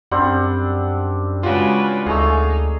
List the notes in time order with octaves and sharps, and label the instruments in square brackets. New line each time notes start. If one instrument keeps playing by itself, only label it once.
[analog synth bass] F#2 [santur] G3 C4 D4 [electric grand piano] F#5
[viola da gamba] C#3 G#3 B4 [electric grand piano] F4 F#4
[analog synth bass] D2 [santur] A3 G#4 [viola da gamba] D#4